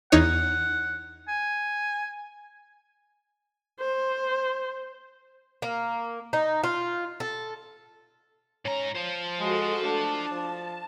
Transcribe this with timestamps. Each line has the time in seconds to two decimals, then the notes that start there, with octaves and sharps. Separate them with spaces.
0.12 E2 D#4 C#5 F#5
1.28 G#5
3.80 C5
5.62 A#3
6.33 D#4
6.63 F4
7.20 A4
8.65 G#2 C#4 A#5
8.95 F3 F4 C5
9.40 G#3 F#4 A4
9.84 A3 D4 A5
10.32 F3